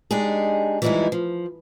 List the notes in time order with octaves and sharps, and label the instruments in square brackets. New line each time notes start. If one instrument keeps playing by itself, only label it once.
[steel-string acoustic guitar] G#3 D4 D#4 G4 G#4
E3 F3 G3 G#3 D#4 E4
F3